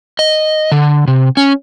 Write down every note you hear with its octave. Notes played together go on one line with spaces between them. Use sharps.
D#5
D3
C3
C#4